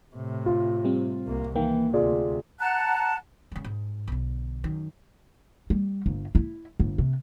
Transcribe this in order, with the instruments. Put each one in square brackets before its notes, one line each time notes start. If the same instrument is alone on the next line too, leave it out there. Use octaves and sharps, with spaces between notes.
[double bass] A2 C3
[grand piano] F4
[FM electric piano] G3 C4
[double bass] C2 A#3
[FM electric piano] D#3 A#3 [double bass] E3 [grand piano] G5
[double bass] D2 C3 [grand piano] F4 G#4 D5
[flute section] F#5 A5 A#5 F#6
[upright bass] C#3 G#3
G#2
B1 D3
F#2 D#3
G3
G1
E4
G1
C3